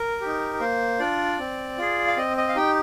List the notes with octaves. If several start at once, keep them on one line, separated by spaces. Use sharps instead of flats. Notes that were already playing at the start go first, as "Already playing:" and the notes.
Already playing: A#4
D#4 G4
A#3 C5
D4 F4 D5
C4
F4 G#4
F5
C4 D#5
D#5
F5
D#4 G4 G5